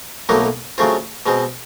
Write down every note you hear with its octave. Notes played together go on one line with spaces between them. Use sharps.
B1 A2 F#3 A#3 D#4
C#3 F#3 A3 C4 F4
B2 G#3 C4